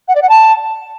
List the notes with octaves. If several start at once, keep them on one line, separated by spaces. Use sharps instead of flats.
F#5
D5
F#5
A5